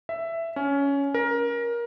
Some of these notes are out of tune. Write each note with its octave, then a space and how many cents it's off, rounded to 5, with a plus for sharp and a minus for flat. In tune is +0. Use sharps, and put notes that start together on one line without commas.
E5 +10
C#4 +15
A#4 +20